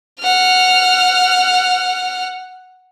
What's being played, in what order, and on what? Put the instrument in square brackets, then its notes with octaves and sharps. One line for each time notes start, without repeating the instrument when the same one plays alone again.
[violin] F#5 F6